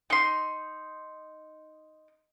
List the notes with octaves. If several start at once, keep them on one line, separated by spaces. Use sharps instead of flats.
D#4 C6